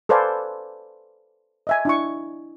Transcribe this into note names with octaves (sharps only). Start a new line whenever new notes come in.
A4 B4 C5 D5 F5 G#5
D#5 E5 G#5
D4 E4 C#6